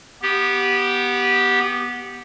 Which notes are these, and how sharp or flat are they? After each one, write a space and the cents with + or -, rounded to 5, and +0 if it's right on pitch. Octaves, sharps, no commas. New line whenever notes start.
B3 -15 G4 -5